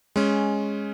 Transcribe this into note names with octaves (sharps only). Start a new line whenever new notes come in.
G#3 C#4